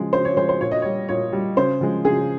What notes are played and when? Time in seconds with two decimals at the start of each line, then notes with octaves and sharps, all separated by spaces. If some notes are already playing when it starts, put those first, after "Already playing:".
Already playing: C#3 F3 G#3
0.13 C#3 C5
0.25 C#5
0.37 F3 G#3 C5
0.49 C5
0.61 A#2 C#5
0.71 D#5
0.82 G3 C#5
1.09 A#2 C#5
1.33 G3
1.57 C#3 C5
1.81 F3 G#3
2.05 C#3 G#4